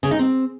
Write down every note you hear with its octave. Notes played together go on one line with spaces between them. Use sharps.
C#3
D#4
C4